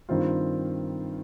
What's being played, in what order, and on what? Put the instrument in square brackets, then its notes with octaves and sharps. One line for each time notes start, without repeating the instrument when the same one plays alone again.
[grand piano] G2 D#3 C4 F4